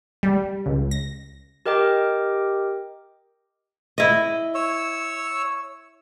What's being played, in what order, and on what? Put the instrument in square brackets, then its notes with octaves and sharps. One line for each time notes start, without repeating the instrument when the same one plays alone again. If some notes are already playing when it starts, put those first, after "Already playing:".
[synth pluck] G3
C#2
A#6
[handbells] G4 A#4 D#5 G5 D6
[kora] E4 D#5
[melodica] C#5 E6